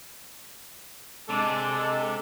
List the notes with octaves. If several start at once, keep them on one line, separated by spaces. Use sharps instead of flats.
C3 G#3 D4 A4